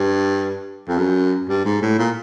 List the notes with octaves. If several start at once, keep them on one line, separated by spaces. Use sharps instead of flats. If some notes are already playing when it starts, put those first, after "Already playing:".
Already playing: G2
F2
F#2
G2
G#2
A2
A#2